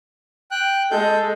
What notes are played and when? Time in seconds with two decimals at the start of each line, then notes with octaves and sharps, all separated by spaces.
0.51 G5 F#6
0.91 G#3 A4 G6